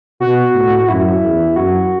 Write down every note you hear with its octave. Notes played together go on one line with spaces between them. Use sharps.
B2 F#4
A2
F#2 E4
E2
F#2 F#4